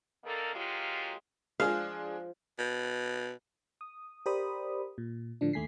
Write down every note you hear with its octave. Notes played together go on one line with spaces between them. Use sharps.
D3 D#3 A#3 A4 A#4
F#3 G#3 A#3 F4 G4
F3 G#3 D4 G#4 C5 F5
B2
D#6
G4 A#4 C5 D5 B5 D#6
A#2
A2 D3 F3 D4
D#2 A3 G#5 B6 C7